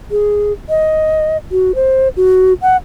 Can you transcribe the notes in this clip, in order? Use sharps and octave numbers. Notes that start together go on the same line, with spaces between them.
G#4
D#5
F#4
C5
F#4
F#5